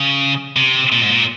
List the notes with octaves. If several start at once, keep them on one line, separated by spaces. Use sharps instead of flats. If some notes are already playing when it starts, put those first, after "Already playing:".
Already playing: C#3
C3
A#2
G#2
A#2